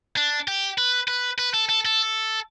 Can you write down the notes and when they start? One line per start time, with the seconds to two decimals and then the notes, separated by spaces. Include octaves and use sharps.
0.17 D4
0.48 G4
0.78 B4
1.08 B4
1.38 B4
1.54 A4
1.69 A4
1.85 A4